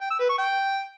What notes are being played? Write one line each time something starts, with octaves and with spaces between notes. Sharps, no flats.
G5
E6
B4
C#6
G5